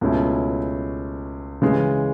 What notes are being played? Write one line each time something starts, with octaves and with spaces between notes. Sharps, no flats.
C#2 B2 A3 C#4 E4
C#3 E3 G#3